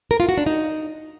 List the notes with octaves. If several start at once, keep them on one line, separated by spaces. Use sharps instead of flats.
A#4
F4
F#4
D4
D#4